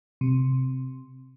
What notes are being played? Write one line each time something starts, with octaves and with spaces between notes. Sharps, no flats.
C3